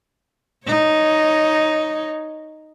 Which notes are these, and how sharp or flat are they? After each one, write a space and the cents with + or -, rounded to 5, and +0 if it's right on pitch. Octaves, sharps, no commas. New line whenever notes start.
D#4 +0 C#5 +0